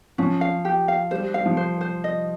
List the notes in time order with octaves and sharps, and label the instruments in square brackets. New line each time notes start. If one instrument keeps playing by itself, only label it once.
[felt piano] F3 [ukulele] C#4
[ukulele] F5
G4
F5
[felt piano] G3 [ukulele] C5
[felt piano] G3
[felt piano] G3 [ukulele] F5
[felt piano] F3
[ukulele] C5
C5
D#5